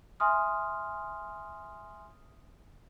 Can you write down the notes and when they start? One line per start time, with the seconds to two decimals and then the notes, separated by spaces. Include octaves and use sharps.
0.20 E5 G#5 C6 D#6 F6